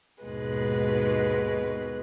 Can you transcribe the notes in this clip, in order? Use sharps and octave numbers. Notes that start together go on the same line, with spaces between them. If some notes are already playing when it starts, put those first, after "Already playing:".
D#2 G#2 B2 G#3 B4